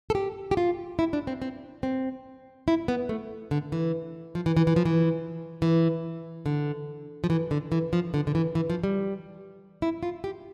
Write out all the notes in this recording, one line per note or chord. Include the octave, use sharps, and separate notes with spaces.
A4
G4
G4
F4
E4
D4
C4
C4
C4
E4
B3
A3
D3
E3
F3
E3
E3
E3
F3
E3
E3
D3
F3
E3
D3
E3
F3
D3
D3
E3
E3
F3
G3
E4
F4
G4